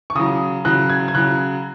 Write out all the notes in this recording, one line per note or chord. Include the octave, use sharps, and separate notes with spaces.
C#6
C#3 F#3 D#6
C#3 F#3 F#6
G#6
G#6
C#3 F#3 F#6